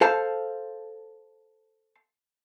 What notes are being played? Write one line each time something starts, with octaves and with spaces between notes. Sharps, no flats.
A4 C5 F5 A5